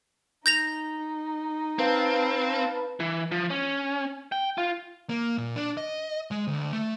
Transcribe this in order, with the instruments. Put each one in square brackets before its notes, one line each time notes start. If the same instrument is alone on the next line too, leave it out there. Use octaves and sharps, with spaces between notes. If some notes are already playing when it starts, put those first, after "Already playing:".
[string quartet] D#4 [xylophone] G6 A#6 F7
[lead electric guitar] C4 [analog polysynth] B4 F5 A5
[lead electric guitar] E3
F3
C#4
G5
F4
A#3
A#2
D4
D#5
G#3
D2
A3